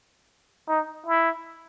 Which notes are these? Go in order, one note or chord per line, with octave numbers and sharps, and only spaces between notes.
D#4
E4